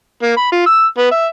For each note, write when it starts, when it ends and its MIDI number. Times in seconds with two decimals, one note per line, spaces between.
0.22 0.35 58
0.37 0.52 83
0.52 0.63 65
0.66 0.86 88
0.98 1.09 59
1.11 1.26 76